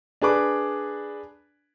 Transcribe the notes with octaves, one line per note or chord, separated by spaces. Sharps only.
D4 G#4 B4 D6